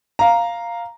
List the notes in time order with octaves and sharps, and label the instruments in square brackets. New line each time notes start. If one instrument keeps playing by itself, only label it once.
[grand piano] F5 A#5